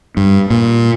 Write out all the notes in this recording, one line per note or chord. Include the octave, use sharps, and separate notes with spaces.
G2
A#2